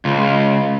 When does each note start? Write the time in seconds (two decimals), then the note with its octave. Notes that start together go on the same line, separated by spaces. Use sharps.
0.05 C#2